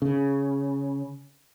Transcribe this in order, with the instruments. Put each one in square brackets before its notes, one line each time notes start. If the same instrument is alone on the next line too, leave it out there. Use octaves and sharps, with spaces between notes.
[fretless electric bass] C#3